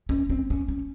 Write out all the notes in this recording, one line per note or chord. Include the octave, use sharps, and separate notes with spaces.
C#4
C4
C#4
C#4